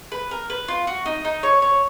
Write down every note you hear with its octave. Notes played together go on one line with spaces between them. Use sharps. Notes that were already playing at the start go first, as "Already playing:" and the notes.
B4
A#4
B4
F4
F#4
D#4
D#4
C#5
C#5